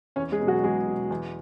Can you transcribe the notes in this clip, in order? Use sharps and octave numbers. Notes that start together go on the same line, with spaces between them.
E2 C#4 C#5
G#3 G#4
B2
F#3 F#4
E2 G#3 G#4
B2
E2